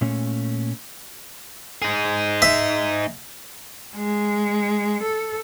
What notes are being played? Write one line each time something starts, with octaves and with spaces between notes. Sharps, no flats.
A#2 A3 C#4
D#4 G#4
E5
G#3
A4